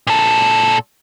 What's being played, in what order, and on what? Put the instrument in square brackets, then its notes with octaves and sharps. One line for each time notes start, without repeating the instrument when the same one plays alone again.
[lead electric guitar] A#2 A4